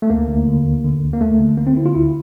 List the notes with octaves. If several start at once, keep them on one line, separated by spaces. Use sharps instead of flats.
A3
D2 A#3
D2
D3
D2
D3
D2
A#3
D2 A3
D3
D3 A#3
C4
D3 E4
F4
D2 E4